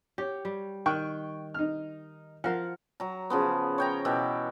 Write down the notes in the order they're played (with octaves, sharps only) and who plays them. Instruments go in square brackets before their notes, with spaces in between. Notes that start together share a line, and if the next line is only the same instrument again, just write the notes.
[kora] G4 [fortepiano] C#5
[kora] G3
[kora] D#3 [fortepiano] G5 C#6 F#6
[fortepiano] D#4 F6
[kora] F3 A#4 F5 [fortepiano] F#5
[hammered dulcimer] F#3 A#5
C#3 F3 B3
C#5 G5 A#5
B2 E3 G4 E5